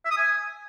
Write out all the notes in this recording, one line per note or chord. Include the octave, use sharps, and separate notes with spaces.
E5
D#6
G#5